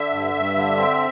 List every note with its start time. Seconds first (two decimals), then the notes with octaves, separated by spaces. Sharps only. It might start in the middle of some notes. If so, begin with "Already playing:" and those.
Already playing: D3 E5
0.11 G2
0.34 G2
0.55 D3
0.77 C4